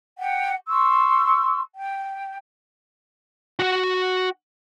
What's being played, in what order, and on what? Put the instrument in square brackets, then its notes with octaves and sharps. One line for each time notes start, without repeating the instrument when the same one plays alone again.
[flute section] F#5 G5
C6 C#6 E6
G5
[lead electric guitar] F#4 F#5